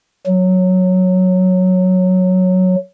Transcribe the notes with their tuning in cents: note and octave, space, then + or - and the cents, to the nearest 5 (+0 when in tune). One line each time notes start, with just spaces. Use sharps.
F#3 -5